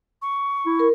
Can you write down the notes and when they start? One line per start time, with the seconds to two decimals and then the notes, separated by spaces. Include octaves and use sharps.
0.22 C#6
0.66 E4
0.79 A#4